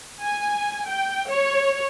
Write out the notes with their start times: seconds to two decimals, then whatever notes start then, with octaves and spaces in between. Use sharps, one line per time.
0.21 G#5
0.86 G5
1.29 C#5